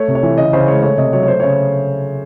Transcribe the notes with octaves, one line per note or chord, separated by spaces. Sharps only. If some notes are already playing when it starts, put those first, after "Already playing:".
Already playing: A3 C#5
C3
C#5
E3
C#3 D#5
C#3 C5
G#3 C#5
A3 C#5
C3 D#5
F#3 C#5
C#5
A3 C5
C#3 C#5